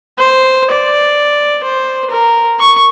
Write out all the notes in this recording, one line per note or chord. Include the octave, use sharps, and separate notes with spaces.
C5
D5
C5
A#4
C#6